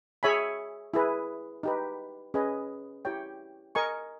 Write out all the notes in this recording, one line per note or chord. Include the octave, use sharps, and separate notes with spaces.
G#4 C#5 E5 G#5 B5
E4 G#4 B4
D#4 G4 B4
C#4 G#4 B4 D#5 G#5
E4 G4 C#5 G5
A#4 D#5 G#5 C#6